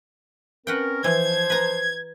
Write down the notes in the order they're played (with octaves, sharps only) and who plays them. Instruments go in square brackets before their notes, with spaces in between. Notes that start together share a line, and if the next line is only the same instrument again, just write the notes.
[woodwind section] C4 C#4 A#4 [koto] B4 F#5 G5
[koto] E3 [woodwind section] F3 C5 [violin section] G#6
[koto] B4 A#5